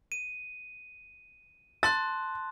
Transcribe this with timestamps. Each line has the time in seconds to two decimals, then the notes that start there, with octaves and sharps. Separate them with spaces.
0.12 D#7
1.83 A5 C6 F#6 A6